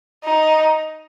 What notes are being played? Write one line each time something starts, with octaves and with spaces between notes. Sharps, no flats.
D#4